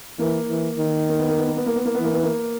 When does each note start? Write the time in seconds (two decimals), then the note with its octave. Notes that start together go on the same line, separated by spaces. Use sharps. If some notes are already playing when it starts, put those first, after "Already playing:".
0.19 E3 A#3
0.49 E3
0.79 D#3
1.09 A#3
1.19 B3
1.28 A#3
1.38 B3
1.47 A#3
1.57 B3
1.66 A#3
1.76 B3
1.85 A#3
1.95 B3
1.99 E3 A#3
2.13 B3
2.23 A#3